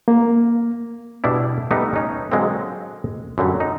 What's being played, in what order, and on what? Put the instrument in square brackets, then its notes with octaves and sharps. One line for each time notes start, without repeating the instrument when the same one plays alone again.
[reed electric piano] A#3
[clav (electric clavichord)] B2 G3 D4 E4
G3 A3 B3 D#4
C#4 D#4 C#5
D3 F#3 G#3 A#3 C4
F#2 D3 F#3 G3
D#4